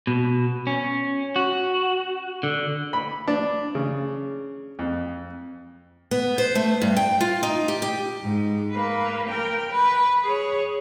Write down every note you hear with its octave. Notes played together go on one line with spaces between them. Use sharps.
B2
C#4
F#4
D3
B5
D4
C#3
F2
B3
C5
A3
G2
G5
F4
D#4
G4
G4
G#2
A#3 B4
A#4 G5
B4
G#4 C#5